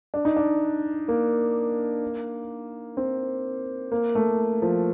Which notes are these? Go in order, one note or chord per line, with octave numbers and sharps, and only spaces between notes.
D4
D#4
D4
A#3
C4
A#3
A3
F3